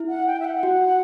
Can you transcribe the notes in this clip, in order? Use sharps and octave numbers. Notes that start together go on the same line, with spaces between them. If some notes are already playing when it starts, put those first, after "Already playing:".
Already playing: E4
F#5
G5
E5
F#5
F#4